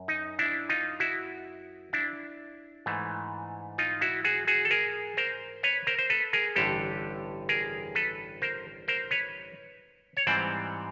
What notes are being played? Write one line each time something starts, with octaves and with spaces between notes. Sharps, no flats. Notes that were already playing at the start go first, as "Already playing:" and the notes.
Already playing: F#2
D#4
D4 E4
D#4 F4
E4 F#4
D4 E4
G#2 E3 A3
D#4 F4
E4 F#4
F#4 G#4
F#4 G#4
A4
G#4 A#4
A#4 C5
B4 C#5
A#4 C5
C5
A4 B4
G#4 A#4
A1 G2 D3 G4 A4
G#4 A#4
A4 B4
A#4 C5
A#4 C5
B4 C#5
C#5
G#2 E3 G3 C4 C5 D5